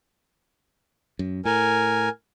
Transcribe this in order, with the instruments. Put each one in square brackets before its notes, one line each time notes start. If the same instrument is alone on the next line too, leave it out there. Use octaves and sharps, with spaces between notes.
[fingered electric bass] F#2
[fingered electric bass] A2 [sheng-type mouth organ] A#4 G#5